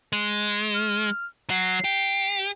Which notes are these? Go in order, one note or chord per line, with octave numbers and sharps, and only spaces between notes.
G#3
F6
F#3 C7
G4